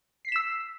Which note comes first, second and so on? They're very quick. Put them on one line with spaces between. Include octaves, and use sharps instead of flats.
C7 B6 E7 E6